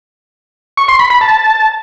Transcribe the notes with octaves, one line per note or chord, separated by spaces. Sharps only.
C#6
C6
B5
B5
A5